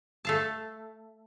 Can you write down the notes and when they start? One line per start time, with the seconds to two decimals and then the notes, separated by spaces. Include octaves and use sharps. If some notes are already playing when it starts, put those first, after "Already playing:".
0.25 A3 F5 A5